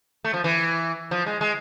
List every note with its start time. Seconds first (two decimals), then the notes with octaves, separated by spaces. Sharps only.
0.24 A3
0.34 F3
0.44 E3
1.11 F3
1.26 G#3
1.41 G#3